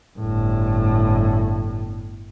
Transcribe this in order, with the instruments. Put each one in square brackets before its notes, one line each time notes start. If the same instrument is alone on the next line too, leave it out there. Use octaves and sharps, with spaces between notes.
[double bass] G1 A2